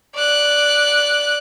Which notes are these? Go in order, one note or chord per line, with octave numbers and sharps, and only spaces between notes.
D5 F#6